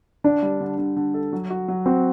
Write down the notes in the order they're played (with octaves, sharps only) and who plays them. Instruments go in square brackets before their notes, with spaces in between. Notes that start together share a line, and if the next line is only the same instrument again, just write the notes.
[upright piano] D3 [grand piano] D4
[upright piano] G3
D3
D3
D3
A4
F#3
F#4
F#3
[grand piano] C4 [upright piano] F#4